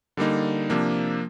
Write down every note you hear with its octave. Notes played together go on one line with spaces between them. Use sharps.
D3 G3 A#3 D#4
C3 F3 A#3 D4